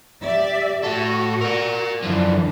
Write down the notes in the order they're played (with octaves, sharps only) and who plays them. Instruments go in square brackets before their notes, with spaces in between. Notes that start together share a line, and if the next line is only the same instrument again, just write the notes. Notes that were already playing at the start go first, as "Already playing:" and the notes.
[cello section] G4 D5 E5
[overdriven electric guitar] A2 A4 [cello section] F#4
[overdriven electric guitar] A#4 D5
[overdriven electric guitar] F#2 F3 [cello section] D3 E3 D4